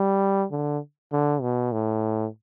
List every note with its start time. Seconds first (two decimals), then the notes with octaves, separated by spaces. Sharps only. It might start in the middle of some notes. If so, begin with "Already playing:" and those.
Already playing: G3
0.51 D3
1.13 D3
1.42 B2
1.72 A2